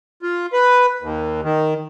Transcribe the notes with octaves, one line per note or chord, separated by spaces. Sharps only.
F4
B4
D#2
D#3